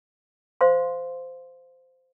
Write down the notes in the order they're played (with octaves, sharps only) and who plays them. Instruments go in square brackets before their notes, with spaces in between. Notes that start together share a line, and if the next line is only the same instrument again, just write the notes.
[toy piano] C5 F5 C6